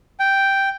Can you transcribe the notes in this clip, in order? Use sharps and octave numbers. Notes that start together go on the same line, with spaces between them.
G5